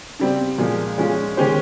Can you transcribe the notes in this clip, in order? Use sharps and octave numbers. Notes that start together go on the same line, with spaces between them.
C#3 G3 C4
A#2 F3 G#3
F3 G#3 C#4 F4
D#3 G#3 C#4 G4 C5